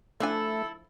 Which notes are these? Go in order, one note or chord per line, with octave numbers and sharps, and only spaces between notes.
F3 A3 D4 E4 A4 G#5